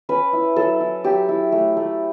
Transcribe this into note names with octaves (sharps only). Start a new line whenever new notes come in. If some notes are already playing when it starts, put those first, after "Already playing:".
C#4 B4
E4
F#3 A4
E4
F#3 G4
E4
A3
A3